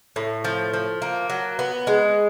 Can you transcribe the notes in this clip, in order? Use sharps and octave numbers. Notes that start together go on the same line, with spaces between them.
A2
F3
F3
A#3
F#3
B3
G#3